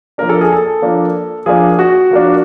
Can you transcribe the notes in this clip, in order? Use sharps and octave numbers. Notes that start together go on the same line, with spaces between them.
F3 A#3 D4 A#4
A4
G#4
A4
F3 A#3 D4
F3 A#3 D4 G#4
F#4
F3 A#3 D4